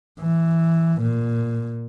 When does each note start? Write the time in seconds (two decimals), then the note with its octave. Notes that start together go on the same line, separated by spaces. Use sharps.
0.20 E3
1.02 A#2